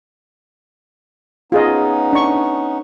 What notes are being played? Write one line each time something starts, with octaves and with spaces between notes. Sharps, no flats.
B3 C#4 D#4 F4 G#4 D#5
D4 C#6